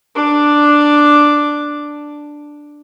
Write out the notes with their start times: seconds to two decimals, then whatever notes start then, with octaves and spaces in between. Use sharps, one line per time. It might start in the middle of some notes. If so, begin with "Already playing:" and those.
0.15 D4 D6